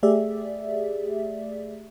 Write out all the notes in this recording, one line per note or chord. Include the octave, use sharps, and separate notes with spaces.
A3 G4 G#4 D5 E5